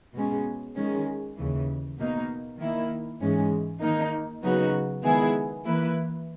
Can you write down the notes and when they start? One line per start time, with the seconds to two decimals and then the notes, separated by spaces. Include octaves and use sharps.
0.14 B2 G#3 C#4
0.76 D#3 G#3 C#4
1.36 D#2 C#3 E3
1.98 B2 A#3 D#4
2.58 D#3 A#3 E4
3.21 G#2 E3 G#3 C#4
3.81 D#3 A#3 D#4
4.42 C#3 F#3 B3 D#4 F#4
5.03 D#3 G#3 B3 E4 G#4
5.65 E3 A#3 E4 B4